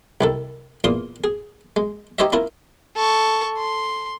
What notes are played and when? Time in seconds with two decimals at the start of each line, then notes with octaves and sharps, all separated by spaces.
0.21 C2 D#3 A4
0.84 E2 A#2 F4 C6 D#6
1.24 G#4
1.76 G#3
2.19 D#4 G4 C5 C#5 D#5 E5
2.32 C#4 E4 F4 A#4
2.96 A4 C#6
3.58 C6